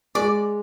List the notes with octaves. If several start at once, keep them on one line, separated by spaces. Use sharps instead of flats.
G#3 D5